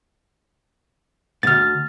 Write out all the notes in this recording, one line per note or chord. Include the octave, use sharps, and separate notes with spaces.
D2 G#2 F6 A6